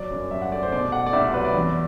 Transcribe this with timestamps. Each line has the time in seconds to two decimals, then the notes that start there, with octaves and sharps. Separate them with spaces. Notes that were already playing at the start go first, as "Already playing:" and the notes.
Already playing: F#3 D5
0.11 F#2
0.31 F#2 E5
0.42 F#5
0.51 A3 D5
0.63 C5
0.72 B2 D5
0.92 A3 F#5
1.06 D5
1.13 C2 E5
1.24 D5
1.34 F#3 B4
1.45 D5
1.54 E2